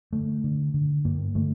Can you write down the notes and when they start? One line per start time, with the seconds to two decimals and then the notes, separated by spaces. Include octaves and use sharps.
0.13 D3 A3
0.44 D3
0.74 D3
1.05 G2 A#3
1.35 D3 A3